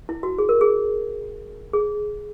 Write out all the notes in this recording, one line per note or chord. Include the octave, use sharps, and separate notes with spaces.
E4
F#4
G#4
A#4
G#4
G#4